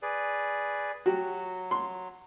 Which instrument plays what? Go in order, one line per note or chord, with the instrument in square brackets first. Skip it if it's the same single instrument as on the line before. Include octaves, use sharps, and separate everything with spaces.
[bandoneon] G#4 B4 D5
[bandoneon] F#3 [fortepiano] F#4 G4
[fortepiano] C6